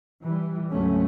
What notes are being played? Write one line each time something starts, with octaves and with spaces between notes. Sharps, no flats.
E3 G3
D2 G#2 F#3 A3 C#4